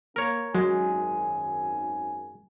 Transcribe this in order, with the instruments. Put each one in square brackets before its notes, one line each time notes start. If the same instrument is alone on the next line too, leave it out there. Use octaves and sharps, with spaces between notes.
[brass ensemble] A#3 [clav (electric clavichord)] A#4 C#5
[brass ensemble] G#1 F#2 G#5 [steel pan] F#3 [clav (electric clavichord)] G#3